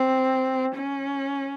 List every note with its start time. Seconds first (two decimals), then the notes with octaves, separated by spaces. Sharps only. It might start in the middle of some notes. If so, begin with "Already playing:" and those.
Already playing: C4
0.75 C#4